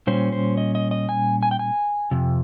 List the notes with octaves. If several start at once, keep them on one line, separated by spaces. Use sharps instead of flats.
A#2 G3 C#4 C5
C5
D#5
D#5
D#5
G#5
G#5
G5
G#5
F2 C3